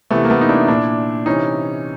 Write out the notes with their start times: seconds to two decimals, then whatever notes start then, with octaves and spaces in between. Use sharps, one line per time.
0.11 C3 E3 A3 B3
0.24 A#3
0.30 A3 B3
0.41 D#4
0.49 D4 E4
0.68 A#2 D4 E4
1.26 C3 E3 C#4 D#4